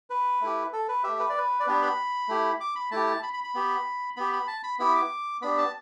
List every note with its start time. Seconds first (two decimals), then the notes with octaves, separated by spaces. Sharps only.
0.10 B4
0.41 A3 E4 G4
0.73 A4
0.89 B4
1.04 A3 G4 E5
1.20 B4
1.29 D5
1.38 B4
1.60 D5
1.66 B3 D4 G4 B4
1.82 B5
2.28 A3 E4 G4
2.60 D6
2.76 B5
2.91 A3 E4 G4 A5
3.07 A5
3.23 B5
3.33 B5
3.44 B5
3.55 B3 G4
4.16 B3 G4 B5
4.33 B5
4.47 A5
4.64 B5
4.79 B3 E4 G4 B5
4.95 D6
5.42 B3 D4 G4 B5
5.58 A5